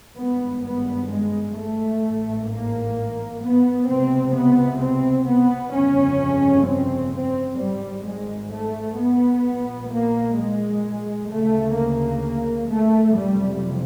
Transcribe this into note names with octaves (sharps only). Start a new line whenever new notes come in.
G#1 G2 B3
B3
G#3
A3
A1 G#2
A#3
B3
C#2 C3 C4
B3
C4
B3
G1 F2 C#3 C#4
C4
C4
G#1 G#2 G3
G#3
A3
B3
A#1 A#2
A#3
G#3
D2 C#3 A3
A#3
A3
F#1 F2 C3 G3